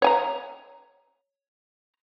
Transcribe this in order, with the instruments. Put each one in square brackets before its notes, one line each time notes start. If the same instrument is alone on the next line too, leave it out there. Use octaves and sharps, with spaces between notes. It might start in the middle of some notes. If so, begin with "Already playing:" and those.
[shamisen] C#5 G#5 A#5